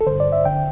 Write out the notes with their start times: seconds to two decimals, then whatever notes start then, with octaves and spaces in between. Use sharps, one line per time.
0.01 A4
0.07 G2 D3 C5
0.20 D5
0.32 E5
0.45 D3 G5